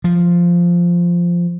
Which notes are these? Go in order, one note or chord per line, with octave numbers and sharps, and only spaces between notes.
F3